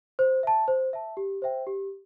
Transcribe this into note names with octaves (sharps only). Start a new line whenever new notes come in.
C5
E5 A5
C5
E5 A5
G4
C5 E5 G5
G4